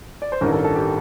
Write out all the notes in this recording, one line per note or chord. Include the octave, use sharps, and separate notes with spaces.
D5
C5
A1 G2 D#3 A#4
A4
A4
G4